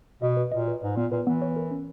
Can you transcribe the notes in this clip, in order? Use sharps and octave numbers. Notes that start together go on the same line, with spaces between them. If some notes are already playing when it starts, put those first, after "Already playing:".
B2 D#5
B4
A#2 D#5
B4
G#2 B4
A#2 B3
A#2 B4
E3 B3
C#5
A#4
C#4